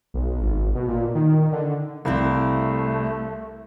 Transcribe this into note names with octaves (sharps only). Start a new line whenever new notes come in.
B1
G#1
B2
A#2
D#3
D3
C2 A3 C4 E4 F5